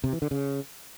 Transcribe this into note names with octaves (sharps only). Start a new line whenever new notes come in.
C3
E3
D3
C#3